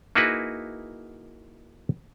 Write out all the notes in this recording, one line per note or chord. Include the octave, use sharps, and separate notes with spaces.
A#3 D#4 E4 F#4 G#4 B4